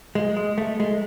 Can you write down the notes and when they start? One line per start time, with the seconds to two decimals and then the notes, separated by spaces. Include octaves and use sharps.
0.15 G#3
0.37 G#3
0.58 A3
0.80 G#3